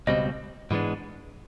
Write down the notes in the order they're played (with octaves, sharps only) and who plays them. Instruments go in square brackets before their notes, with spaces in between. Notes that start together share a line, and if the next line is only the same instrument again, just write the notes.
[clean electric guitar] C#2 B2 G3 C4 [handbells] D#5
[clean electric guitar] G#2 E3 G#3 B3 D4